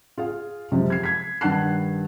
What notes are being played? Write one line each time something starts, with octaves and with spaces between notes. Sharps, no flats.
F4 G#4 F5
F#2 C3 F3 G#3
G#6 C7
G#6 B6
G2 D#3 F#5 A5 F#6 C7